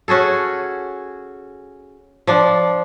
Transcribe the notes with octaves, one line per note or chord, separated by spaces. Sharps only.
C#4 F#4 G#4 A4
F3 D4